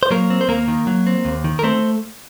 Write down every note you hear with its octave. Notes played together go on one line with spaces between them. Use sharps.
C5
F#3 A#3 A#4
C4
C5
D#2 A#3 A#4
D#3
F#3
C4
D#2
D#3
A#4
A3 C4 C5